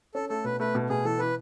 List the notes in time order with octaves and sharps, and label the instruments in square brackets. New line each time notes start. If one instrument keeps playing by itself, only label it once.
[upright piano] C#4 [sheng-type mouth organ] A4
[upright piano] A3 [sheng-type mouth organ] A4
[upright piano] B2 [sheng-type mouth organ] B4
[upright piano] A3 [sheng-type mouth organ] B4
[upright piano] B2
[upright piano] B2 [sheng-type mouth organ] G#4
[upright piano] E3 [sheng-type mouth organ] A4
[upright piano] E3 [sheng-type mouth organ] B4